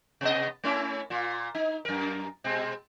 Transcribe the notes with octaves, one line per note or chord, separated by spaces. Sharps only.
C3 B3 D#5
A3 C#4 E4
A#2 F4
D#4
F#2 A#4
B2 G#3 C4